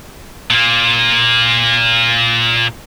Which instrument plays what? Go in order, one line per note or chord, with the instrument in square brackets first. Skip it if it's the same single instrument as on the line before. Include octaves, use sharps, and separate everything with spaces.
[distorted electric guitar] A#2 A#3